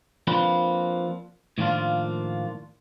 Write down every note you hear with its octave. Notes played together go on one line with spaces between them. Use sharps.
F3 A#3 C4 D4 B4
A2 D#3 F3 A#3 D4 F4